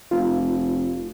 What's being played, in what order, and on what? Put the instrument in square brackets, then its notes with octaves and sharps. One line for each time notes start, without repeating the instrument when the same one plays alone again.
[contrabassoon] F1 [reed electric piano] F4